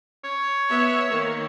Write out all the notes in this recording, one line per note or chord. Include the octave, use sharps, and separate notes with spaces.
C#5
B3 E5
D#3 A#3